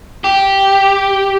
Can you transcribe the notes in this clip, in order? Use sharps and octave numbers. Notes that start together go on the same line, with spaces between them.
G4